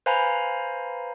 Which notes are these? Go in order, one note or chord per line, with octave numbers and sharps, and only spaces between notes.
B4 C5 F5 G#5 A#5 B5